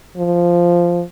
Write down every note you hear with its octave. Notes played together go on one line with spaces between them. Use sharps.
F3